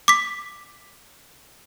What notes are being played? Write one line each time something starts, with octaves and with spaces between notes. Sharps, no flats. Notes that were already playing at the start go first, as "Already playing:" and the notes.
D6 B6